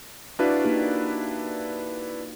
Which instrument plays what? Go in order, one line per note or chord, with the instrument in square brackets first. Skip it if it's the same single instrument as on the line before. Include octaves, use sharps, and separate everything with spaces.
[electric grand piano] D4 E4 B4 [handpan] F#4 D5 F5
[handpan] A#3 D#4 G4